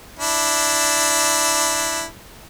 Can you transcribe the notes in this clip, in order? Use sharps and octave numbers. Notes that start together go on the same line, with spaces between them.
D4 E4